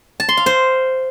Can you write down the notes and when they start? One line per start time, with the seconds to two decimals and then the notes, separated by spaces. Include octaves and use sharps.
0.20 A5
0.29 C6
0.37 F5
0.46 C5